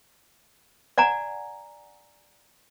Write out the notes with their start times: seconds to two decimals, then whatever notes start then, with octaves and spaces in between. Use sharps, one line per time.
0.98 D5 F#5 G#5 A#5